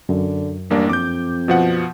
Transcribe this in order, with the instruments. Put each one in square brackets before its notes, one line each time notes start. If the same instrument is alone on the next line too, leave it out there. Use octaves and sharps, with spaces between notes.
[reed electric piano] F#2 [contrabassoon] D3
[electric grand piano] A1 A#3 D4 [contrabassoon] G2
[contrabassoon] F2 [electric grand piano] D6 G6
[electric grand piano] B2 F3 F#5